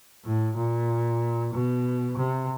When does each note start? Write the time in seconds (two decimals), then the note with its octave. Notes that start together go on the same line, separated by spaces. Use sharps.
0.25 A2
0.56 A#2
1.53 B2
2.17 C3